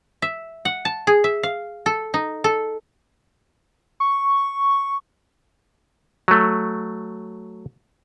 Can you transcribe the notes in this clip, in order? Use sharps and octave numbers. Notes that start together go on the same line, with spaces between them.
E5
F#5
A5
G#4
E5
F5
A4
D#4
A4
C#6
F#3 A3